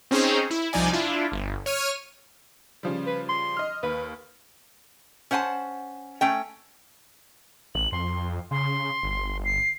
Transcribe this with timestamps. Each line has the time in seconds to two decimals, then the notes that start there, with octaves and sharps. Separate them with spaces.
0.11 C4 C#4 D#4 G#4 C5 C#5
0.50 E4
0.73 C2 F3 D#4 D5 G#5
0.93 D4 E4 F4
1.32 G1
1.66 C#5 F6 D#7
2.83 C#3 F3 G3
3.07 B4
3.29 C6
3.57 D#5 F6
3.83 D#2 B4
5.31 C#4 C5 F#5 G#5 A5
6.21 A3 C#4 G5
7.75 A1 F#7
7.92 F2 C6
8.51 C#3 C6
9.03 G1
9.45 C7